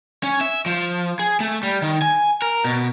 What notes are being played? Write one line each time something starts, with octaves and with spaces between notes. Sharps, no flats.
C#4
E5
F3
G#4
A3
G3
D#3
G#5
A#4
B2